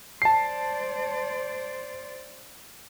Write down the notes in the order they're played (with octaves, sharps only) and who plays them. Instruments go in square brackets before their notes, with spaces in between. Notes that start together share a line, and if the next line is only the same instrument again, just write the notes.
[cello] C5 D5 [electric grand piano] A5 C7